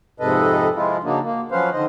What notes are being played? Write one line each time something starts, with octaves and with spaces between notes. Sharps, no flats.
F2 G#2 C3 A4 B4 D#5
F3 G#3 E4 F4
C#3 F#3 A#3 D4 D#4
A#3
F3 F#3 C#4 B4 C5 F5
D3 D#3 C5 D#5